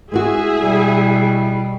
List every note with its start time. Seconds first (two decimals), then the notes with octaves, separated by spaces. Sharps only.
0.12 G#3 B3 E4 F#4 G#4 E5 G#5
0.61 B2 G3